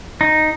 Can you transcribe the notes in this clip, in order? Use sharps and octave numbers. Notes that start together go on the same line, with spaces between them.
D#4